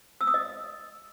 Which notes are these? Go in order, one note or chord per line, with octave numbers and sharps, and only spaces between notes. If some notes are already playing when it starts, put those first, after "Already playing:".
E6
D#6
D#5